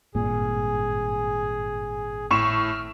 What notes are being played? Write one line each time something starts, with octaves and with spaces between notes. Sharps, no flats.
G#1 G2 A#2 G#4
A2 C#6 E6 F6 E7